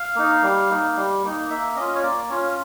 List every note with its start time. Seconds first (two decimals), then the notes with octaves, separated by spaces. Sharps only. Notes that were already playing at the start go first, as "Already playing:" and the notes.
Already playing: F5
0.16 A#3 D#4
0.43 G3
0.70 A#3 D#4
0.96 G3
1.23 A#3 D#4
1.50 A#3 E5
1.76 C#4 F4 D#5
1.95 C#5
2.02 A#3 D5
2.30 C#4 F4 C#5